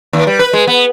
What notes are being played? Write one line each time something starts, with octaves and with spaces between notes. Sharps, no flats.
D#2
G3
B4
G#3
B3